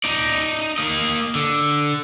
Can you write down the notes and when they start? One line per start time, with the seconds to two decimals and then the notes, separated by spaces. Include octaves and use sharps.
0.04 D#4 D5
0.78 A#3 D#5
1.35 D3